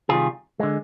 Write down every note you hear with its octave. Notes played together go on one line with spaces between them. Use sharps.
C3 D#3 G3 F4 G#4
D3 G#3